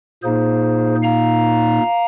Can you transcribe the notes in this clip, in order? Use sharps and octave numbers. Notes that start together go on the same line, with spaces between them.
A#2 A#3 D#4 G#4 C5
F5 A#5